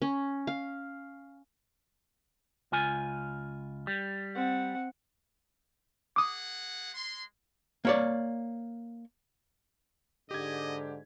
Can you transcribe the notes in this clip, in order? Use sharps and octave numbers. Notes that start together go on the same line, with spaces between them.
C#4
F5
C#2 F4 G#5
G3
C4 F#5
A#3 G#4 F#5 D6 D#6
G#3 C6
A#3 C#5 D5
G#2 D3 G4 D#5 G#6